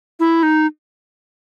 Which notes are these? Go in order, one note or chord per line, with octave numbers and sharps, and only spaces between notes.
E4
D#4